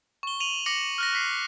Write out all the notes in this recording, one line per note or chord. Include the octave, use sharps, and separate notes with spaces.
C#6 G7
D#7 F7 F#7
D6 A#6 C#7 F#7
F6 F#6 A#6
F#6 B6 C7